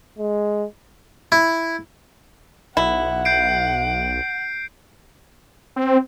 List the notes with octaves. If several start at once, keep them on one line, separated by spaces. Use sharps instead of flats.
G#3
E4
B1 E4 F#5
G6 C7 D7
C4